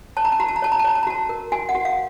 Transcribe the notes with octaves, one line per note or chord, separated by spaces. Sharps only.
C#5 A5
A#5
A5
F#4 A#5
A5
A#5
C#5 A5
A#5
A5
C#5 A#5
A5
A#5
F#4 A5
A#4
F#4 G#5
F#5
F#4
F5